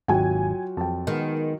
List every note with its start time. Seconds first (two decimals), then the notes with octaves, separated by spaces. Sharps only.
0.08 G#1 D#2 F#3 F4 F#4 G5 G#5
0.77 F2 G5 A5
1.07 D#3 G#3 B3